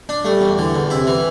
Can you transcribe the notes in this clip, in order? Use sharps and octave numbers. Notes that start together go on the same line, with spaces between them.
D4
G3 A3
E2
D3 E3
E2
C3 E4
E3